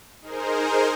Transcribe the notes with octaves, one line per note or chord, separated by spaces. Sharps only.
D#4 G#4 A#4 C5